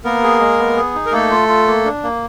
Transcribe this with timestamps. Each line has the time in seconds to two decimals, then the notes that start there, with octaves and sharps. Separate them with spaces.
0.04 A#3 B3 A#4
0.23 G#4
0.40 G#3
0.59 B3
0.77 G#4
0.95 D#4
1.06 A#4
1.12 A3 A#3 A4
1.31 F4
1.49 F4
1.67 A#3
1.85 D4
2.03 A#3